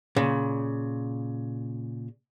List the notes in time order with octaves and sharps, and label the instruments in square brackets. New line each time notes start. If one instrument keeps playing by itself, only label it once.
[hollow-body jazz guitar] A#2 C#3